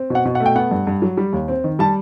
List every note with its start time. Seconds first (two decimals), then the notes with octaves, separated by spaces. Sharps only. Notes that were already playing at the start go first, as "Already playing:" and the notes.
Already playing: C4
0.10 B2 F#5
0.25 B2
0.35 F#5
0.40 A3
0.46 G5
0.55 B3 F#5
0.71 G2
0.87 G2
1.02 F#3
1.17 G3
1.33 D#2
1.48 C4
1.64 D#3
1.79 G3 A5